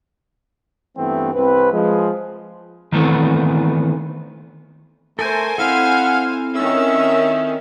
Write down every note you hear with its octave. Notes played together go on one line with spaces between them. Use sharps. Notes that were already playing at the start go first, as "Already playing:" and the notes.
G2 E3 A3 B3 C4
C2 C4 B4
F3 G#3
D#3 E3 A3 B3 C4
A3 A4 A#4 C5 G#5 G6
C4 E4 A4 F5 F#5
D#3 C#4 E5 E6